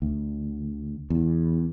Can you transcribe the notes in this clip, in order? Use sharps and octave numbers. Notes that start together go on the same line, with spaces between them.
D2
E2